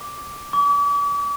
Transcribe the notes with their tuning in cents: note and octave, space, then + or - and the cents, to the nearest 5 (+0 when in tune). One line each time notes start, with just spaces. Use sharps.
D6 -5
D6 -45